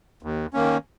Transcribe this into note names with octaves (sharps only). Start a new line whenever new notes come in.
D#2
D#3 A#3 C#4